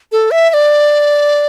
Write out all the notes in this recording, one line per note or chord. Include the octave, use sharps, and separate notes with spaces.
A4
E5
E5
D5